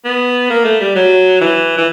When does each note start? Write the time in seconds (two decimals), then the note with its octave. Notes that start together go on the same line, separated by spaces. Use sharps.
0.05 B3
0.50 A#3
0.65 A3
0.80 G3
0.96 F#3
1.41 E3
1.78 E3